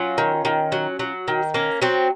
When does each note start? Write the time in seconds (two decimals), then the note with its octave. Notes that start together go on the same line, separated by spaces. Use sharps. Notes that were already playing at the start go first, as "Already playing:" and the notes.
Already playing: F#3 C#4 F4
0.18 D#3
0.45 D#3
0.72 F#3
0.99 F#3
1.28 D#3
1.54 A#3 C#4
1.82 F#3 C4